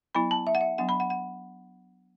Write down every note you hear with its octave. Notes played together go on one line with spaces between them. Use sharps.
F#3 B3 E4 B5
A5
E5
F#5
E5
F#3 B3 D4 F#5
B5
F#5
F#5